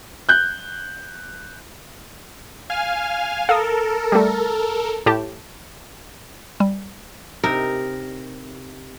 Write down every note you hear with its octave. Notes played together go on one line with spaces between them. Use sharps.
F#6 G6
F5 G#5 F6
A4 A#4 F5 D#6
G3 A3
A2 G4 A5
G3
C3 D#4 A#4